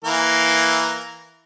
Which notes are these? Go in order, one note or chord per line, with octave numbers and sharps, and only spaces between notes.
E3 A#3 A#4